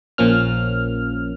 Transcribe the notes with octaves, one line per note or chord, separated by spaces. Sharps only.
A#1 A#2 F3 A#3 C#4 F6